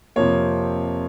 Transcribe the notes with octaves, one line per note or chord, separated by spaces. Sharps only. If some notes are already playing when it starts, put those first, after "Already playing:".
F2 C3 F3 A#3 C#5